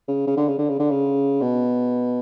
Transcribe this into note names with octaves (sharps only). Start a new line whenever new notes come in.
C#3
C#3
D3
C#3
D3
C#3
D3
C#3
B2